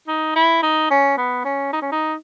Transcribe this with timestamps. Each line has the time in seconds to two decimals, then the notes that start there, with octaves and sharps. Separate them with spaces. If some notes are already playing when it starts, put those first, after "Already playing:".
0.08 D#4
0.36 E4
0.63 D#4
0.91 C#4
1.17 B3
1.45 C#4
1.73 D#4
1.82 C#4
1.92 D#4